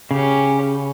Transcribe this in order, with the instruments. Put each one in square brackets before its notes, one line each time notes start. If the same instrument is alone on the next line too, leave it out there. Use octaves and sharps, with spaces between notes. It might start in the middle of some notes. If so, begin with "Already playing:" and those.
[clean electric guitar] C#3 [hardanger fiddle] C#4 G4